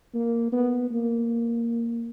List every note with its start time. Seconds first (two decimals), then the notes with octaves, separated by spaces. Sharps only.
0.14 A#3
0.52 B3
0.91 A#3